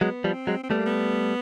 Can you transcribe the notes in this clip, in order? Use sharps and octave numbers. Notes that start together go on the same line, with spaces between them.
F#3 G#3 B3
F3 G3
C4
F#3 G#3
C4
G3 A3 B3
A#3
B3